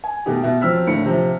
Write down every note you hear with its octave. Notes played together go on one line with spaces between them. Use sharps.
G#5
B2 D#3 A3 D#4 G4
B2 E5
F3 F#3 C4 E6 F6 B6
D#2 A2 D3 C#7
C3 F3